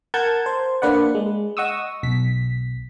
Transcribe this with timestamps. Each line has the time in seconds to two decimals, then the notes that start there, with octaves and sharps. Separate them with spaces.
0.14 A#4 F#5 A5 G6 G#6
0.46 C5
0.82 A#3 D4 B4 D5 F#5
1.15 G#3
1.57 D#5 F#5 C#6 D#6 E6
2.03 B1 B6